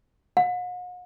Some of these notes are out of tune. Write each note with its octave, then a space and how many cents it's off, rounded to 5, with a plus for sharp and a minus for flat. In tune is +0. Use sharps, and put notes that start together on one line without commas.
F#5 -45